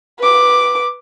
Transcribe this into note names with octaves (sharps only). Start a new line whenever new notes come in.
B4 D6